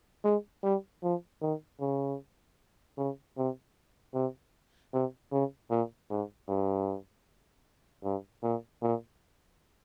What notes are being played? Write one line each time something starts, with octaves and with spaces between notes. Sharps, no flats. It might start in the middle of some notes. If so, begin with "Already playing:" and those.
G#3
G3
F3
D#3
C#3
C#3
C3
C3
C3
C#3
A#2
G#2
G2
G2
A#2
A#2